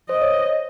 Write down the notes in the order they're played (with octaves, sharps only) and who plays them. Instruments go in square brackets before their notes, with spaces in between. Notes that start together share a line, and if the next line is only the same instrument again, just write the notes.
[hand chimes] C5 [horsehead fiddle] D#5
[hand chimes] C#5